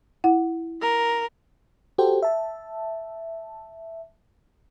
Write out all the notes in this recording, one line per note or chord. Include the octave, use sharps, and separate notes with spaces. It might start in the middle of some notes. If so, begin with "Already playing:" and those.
E4 F#5
A#4
F#4 G4 A4 C5 G5
E5 A5